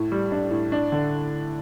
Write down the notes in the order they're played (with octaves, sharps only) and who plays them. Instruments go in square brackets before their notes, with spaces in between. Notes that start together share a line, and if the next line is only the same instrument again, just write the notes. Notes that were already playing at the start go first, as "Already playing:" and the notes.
Already playing: [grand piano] A2
G3
D4
A2
D4
D3